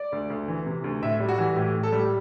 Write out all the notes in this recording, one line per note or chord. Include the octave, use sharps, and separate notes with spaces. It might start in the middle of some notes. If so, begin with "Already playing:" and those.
Already playing: D5
D2
D2
E3
C3
D2
A2 E5
G3
F#4
E3
A2 G4
A2
A4
G3